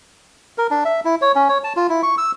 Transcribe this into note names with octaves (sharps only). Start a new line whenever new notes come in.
A#4
D4
E5
E4
C#5
C#4
C#5
A5
F4
E4
C#6
E6